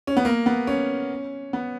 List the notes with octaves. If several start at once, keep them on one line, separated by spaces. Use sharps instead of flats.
C#4
B3
A#3
B3
C#4
B3